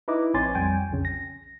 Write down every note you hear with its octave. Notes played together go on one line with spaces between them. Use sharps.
D#4 E4 B4 D#5 D6
A#1 C4 C#5 G#5 C6 A6
F2 G3 G5 G#5
B1 F2 C#3 C#4
A#6